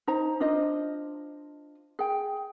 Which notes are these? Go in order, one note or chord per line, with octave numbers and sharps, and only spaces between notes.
D#4 C5 A#5
D4 F4 C5 D#5
G#4 G5